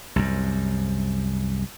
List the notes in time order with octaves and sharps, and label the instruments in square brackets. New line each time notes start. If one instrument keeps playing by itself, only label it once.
[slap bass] C2 F#2